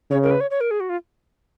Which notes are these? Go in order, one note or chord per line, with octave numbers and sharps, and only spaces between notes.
C#3 C#5
A#4
B4
C#5
C#5
A#4
G#4
F#4
F4